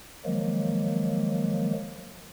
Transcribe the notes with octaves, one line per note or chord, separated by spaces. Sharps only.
D#3 F3 F#3 G#3 A#3